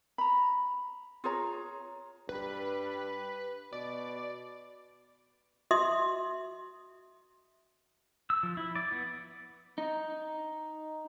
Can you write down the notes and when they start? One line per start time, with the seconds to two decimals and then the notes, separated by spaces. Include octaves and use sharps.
0.18 A#5 B5
1.24 F4 G#4 C#5 A#5
2.29 G2 B4
3.73 B2 D5
5.71 F#4 D#5 E5 C6 D#6
8.30 E6
8.43 F3
8.57 E4
8.76 D5
8.92 B3
9.78 D#4